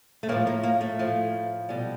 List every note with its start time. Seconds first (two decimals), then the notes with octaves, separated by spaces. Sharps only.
0.23 A3
0.29 A2 A#3
0.32 F3
0.47 A#3
0.63 A#3
0.81 A3
0.99 A2 F3
1.69 B2 G3